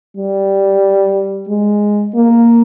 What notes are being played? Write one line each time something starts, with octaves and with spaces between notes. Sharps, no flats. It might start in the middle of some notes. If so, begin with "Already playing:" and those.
G3
G#3
A#3